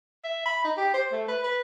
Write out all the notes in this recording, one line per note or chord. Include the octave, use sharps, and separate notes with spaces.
E5
B5
D#4
G4
C5
A3
B4
B4